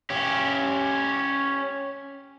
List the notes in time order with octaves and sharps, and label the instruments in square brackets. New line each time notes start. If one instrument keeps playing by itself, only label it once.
[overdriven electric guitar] C#4 G4